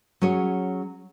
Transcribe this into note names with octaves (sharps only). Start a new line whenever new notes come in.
F#3 C#4 G#4 C#5